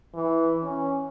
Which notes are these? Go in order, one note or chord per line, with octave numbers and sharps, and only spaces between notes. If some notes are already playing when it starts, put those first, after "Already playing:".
E3
C#4